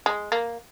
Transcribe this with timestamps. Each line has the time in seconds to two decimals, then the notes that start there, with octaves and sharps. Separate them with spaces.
0.06 G#3
0.32 A#3